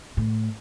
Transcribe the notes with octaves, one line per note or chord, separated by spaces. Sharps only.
A2